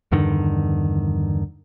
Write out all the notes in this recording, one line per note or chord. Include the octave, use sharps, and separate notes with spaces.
E2 G2 D3 D#3